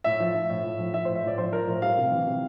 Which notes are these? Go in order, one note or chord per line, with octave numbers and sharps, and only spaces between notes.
A2 E5
F3
F3
A2
A2
F3
F3 E5
A2 C5
E5
A2 D5
F3 C5
F3 A#4
A2
G3 F5
C3
E3
C3